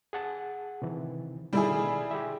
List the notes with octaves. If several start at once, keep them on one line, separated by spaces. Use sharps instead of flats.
G#4 F#5 A5
C3 D#3 E3
B2 D3 D#3 G3 E4 G#4
G4 G#4 E5